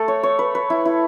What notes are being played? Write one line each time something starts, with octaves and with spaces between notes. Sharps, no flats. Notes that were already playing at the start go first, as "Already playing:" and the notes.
Already playing: A3 A4
C#5
C#5
B4
B4
E4
E4